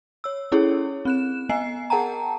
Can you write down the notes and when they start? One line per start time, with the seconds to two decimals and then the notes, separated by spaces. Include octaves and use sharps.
0.24 C#5 E6
0.52 C#4 E4 G#4 A4 C#5
1.05 C4 F#6 E7
1.49 B3 D#5 G#5 C7
1.90 G#4 A#4 F#5 G5 A5 A#5